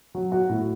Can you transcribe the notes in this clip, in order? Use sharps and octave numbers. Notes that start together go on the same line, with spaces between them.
F#3
F#4
A2